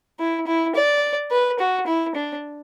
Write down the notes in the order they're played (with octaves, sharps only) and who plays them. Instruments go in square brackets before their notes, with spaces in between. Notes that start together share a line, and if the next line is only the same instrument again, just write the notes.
[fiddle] E4
E4
D5
B4
F#4
E4
D4